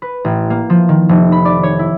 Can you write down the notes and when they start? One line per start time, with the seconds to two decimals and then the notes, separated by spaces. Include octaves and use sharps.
0.02 B4
0.25 A1
0.50 A#3
0.70 F3
0.89 D#3
1.09 F1
1.32 B5
1.45 D5
1.63 C#5
1.79 E4